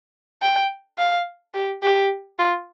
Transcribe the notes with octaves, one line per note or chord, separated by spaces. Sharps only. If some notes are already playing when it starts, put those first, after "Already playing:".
G5
F5
G4
G4
F4